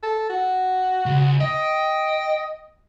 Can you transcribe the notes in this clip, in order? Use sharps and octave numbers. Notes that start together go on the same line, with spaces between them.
A4
F#4
C#2
D#5 G5